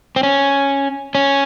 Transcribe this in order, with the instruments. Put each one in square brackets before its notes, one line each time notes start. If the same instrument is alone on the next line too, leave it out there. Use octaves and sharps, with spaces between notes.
[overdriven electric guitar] C4
C#4
C#4